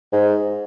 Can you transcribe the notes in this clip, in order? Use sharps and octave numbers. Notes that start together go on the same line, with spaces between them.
G#2